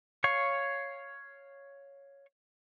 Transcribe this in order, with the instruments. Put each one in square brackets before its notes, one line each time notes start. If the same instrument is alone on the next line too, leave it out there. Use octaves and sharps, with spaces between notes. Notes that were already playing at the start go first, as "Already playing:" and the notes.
[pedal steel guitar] C#5 F5 C#6